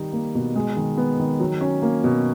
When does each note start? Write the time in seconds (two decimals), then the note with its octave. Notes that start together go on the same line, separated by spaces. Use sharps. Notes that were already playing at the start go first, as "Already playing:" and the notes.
Already playing: D#3 G3 D#4
0.13 A#3
0.35 B2
0.56 G#3
0.76 D#3
0.97 B3
1.20 D#3
1.40 F#3
1.61 C#4
1.82 A#3
2.04 B2